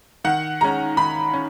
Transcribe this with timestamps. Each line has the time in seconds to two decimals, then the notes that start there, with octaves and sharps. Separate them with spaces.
0.24 D#3 F#5
0.61 G#3 C#4 A#5
0.97 D#3 B5
1.34 C#4